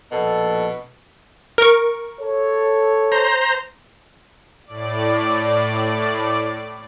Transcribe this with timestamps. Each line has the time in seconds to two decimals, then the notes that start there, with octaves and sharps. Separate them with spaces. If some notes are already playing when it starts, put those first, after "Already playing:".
0.12 A#1 B2 A4
1.58 A#4 C#6
2.20 A4 C#5
3.12 C5 A#5
4.66 A2 D5